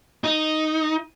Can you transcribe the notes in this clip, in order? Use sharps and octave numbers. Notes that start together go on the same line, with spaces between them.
D#4